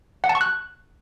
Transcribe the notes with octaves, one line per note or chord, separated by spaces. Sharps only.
F#5
A5
C#6
F#6